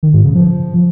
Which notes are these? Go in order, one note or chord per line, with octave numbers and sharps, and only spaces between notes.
D#3
G#2
C#3
F3